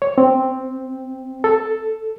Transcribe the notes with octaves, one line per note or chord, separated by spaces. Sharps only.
C#5
C4
A4